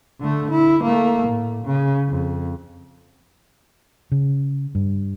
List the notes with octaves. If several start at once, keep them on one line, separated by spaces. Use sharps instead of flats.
D3 A3
E4
A3 A#3
A2
C#3
F2
C#3
G2